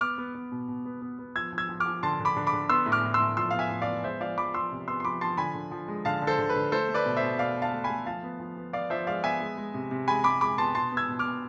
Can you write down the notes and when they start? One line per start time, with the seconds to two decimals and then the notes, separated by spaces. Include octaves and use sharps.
0.01 B3 D6 F6
0.18 B3
0.35 B3
0.52 B2
0.68 B2
0.85 B3
1.02 B3
1.19 B3
1.35 F3 E6 G#6
1.53 F3
1.58 E6 G#6
1.69 F3
1.80 D6 F6
1.86 F3
2.03 D3 A5 C6
2.20 D3
2.25 B5 D6
2.36 D3
2.47 B5 D6
2.53 D3
2.69 B3 C6 E6
2.86 A2
2.92 D6 F6
3.03 A2
3.14 C6 E6
3.20 A2
3.37 F3 C6 E6
3.51 B3 F5
3.59 E5 G#5
3.70 A2
3.82 D5 F5
3.87 B3
4.04 G#3 C5 E5
4.20 F3 D5 F5
4.38 F3 B5 D6
4.54 F3 C6 E6
4.71 C3
4.88 B3 C6 E6
5.00 C6
5.04 F3 B5 D6
5.21 F3 A5 C6
5.37 D3 G#5 B5
5.55 D3
5.71 F3
5.88 G#3
6.05 D3 F5 A5
6.22 D3
6.27 A4 C5
6.39 D3
6.49 B4
6.55 D3
6.72 A3 A4 C5
6.89 A3
6.94 B4 D5
7.06 B2
7.17 C5 E5
7.23 B2
7.39 B2 D5 F5
7.56 B2
7.62 F5 A5
7.73 A3
7.84 G#5 B5
7.90 A3
8.06 F3 F5 A5
8.23 B3
8.39 F3
8.57 B3
8.73 B3 D5 F5
8.90 F3 C5 E5
9.07 G#3 D5 F5
9.24 B3 E5 G#5
9.40 G#3
9.57 G#3
9.74 C3
9.91 C3
10.08 G#3 G#5 B5
10.24 C3 B5 D6
10.41 G#3 B5 D6
10.58 B3 A5 C6
10.75 B2 A5 C6
10.92 B3 E6 G#6
11.09 B2
11.19 D6 F6
11.25 B3